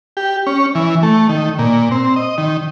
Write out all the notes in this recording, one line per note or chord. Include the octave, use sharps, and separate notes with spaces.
G4
C#4
E3
A3
D#3
A#2
C4
D#5
D#3